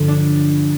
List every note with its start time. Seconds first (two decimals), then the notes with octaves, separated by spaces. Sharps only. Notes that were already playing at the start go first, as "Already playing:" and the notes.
Already playing: G2 D3 F3
0.08 D4